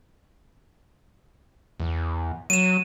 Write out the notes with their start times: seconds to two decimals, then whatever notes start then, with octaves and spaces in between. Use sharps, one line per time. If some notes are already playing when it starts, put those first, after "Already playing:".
1.80 E2
2.50 F#3 D#7 E7